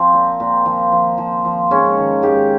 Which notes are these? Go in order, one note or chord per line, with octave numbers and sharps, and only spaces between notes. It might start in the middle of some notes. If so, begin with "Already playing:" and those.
Already playing: F3 C4
A#2
A#2
F3
F3
F3
F3
G#2 C#4
D#3
G#2 G4